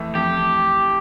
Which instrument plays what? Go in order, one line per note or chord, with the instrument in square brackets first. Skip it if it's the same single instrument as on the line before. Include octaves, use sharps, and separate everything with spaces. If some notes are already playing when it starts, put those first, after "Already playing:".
Already playing: [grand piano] F2 E3 A3
[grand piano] F2 [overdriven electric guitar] G4